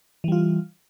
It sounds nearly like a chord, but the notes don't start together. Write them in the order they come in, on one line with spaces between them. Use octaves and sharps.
E3 G3 F4